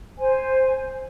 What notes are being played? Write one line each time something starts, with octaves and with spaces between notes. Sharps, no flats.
C5 G#5